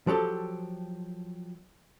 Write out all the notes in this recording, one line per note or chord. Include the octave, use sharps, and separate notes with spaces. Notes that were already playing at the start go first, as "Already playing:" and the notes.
F3 F#3 G4 A4